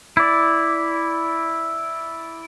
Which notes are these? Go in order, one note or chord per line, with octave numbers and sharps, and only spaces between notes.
E4 D5